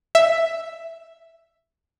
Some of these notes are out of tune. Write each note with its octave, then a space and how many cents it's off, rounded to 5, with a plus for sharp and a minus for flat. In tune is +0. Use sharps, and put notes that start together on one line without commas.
E5 +5